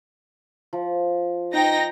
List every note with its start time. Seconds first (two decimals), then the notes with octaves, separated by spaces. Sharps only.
0.73 F3
1.54 D#4 G5 A#6